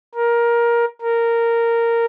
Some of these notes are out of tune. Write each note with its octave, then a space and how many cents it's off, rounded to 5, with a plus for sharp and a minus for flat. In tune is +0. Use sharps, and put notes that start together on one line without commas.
A#4 +15
A#4 -10